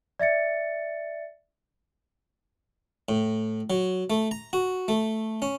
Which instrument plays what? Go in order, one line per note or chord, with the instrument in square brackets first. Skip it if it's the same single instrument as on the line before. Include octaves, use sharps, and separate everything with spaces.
[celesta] D5 E5 A6 C#7
[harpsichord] A2
F#3
A3
A#5
F#4
A3
C#4